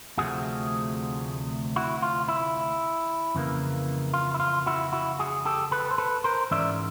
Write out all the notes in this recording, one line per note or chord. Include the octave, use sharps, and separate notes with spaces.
D2 C3 F3 A3 F#4 G#4
E4 F#4
F4
E4
F2 C#3 E3 G3 A#3
F4
E4
F4
E4 F#4
E4 F#4
F#4 G#4
G4 A4
A4 B4
C5
A4 B4
A#4 C5
G#2 E3 G#3 C#4 D5 E5